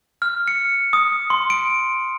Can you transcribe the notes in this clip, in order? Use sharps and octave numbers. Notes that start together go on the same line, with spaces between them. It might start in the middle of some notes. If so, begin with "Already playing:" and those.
F6
C#7
D#6
C6
D7